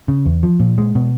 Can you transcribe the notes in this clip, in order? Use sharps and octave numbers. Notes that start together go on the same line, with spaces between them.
C#3
E2
F3
A#2
G#3
B2